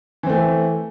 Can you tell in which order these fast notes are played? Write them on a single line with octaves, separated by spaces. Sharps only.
E3 C4 A3